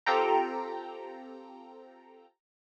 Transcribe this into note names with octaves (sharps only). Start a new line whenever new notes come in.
C4 F4 G4 A4 G5 A#5